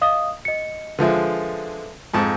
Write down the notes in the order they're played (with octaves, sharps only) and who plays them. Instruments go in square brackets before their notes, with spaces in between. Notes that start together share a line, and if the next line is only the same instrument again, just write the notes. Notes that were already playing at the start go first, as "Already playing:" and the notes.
[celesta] D#5 F5 D#6
D#5 C#7
[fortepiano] D3 F3 G#3 [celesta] B4 E5
[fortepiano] F2 G#2 A5